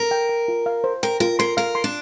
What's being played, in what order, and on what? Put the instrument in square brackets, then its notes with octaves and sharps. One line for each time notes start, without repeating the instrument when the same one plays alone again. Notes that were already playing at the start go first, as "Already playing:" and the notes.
Already playing: [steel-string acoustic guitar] A#4
[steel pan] G5
G5
F4
F5
C5
[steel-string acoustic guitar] A#4 [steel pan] G5
[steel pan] F4 [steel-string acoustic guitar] A#4
[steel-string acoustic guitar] A#4 [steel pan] C6
[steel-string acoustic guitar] A#4 [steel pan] F5
[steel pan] C6
[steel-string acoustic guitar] D4